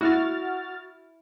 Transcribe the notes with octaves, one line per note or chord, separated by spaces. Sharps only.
E4 F#4 F6 A6